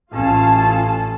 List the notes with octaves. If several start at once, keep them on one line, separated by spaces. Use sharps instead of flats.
A1 C#4 F4 F5 A5